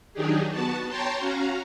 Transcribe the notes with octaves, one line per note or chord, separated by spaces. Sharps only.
D#3 F#3 D4 D#4 G4 G#4
B3 F#4 A5
C#5 G5 A5 A#5 C6
C#4 F#4 F5 A#5